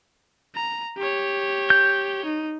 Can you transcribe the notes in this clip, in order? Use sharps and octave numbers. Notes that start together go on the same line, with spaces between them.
A#5
G4 C#5
G6
D#4